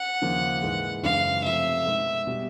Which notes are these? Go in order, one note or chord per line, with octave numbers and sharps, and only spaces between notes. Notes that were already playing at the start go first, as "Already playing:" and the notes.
Already playing: F#5
D#2 C#3 F3 A#3 D#4
G#2 E3 G#3
F#2 C#3 E3 G#3 F5
C3 F3 A3 E5
B2 G#3 B3 D#4 G#4
B2 G3